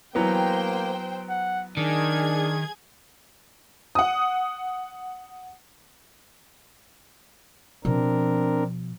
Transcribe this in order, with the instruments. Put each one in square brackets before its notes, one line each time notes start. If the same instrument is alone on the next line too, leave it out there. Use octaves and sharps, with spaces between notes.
[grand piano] E3 F#3 B3 [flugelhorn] A#3 [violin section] C5 G5
[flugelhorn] F#5
[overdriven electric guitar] D#3 [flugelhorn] D4 [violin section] G#4 G#6
[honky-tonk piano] F#5 D#6
[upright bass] B2 F3 [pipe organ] C4 D4 A#4